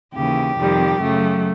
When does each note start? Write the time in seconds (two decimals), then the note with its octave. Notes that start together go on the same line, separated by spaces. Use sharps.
0.14 D#2 C#3 E3 G4
0.58 F2 C3 D#3 G3
1.01 F#2 C#3 F#3 A3